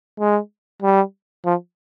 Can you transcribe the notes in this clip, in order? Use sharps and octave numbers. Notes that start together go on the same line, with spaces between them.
G#3
G3
F3